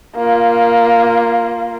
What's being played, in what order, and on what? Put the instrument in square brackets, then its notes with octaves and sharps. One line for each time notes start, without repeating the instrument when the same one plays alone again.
[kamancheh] A#3 F4